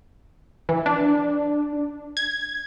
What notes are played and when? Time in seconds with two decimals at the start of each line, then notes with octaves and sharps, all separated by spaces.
0.69 E3
0.86 D4
2.17 G#6